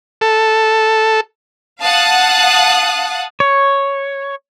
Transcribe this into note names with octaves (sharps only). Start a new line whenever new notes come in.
A4
F5 F#5 A5 D#6 F#6
C#5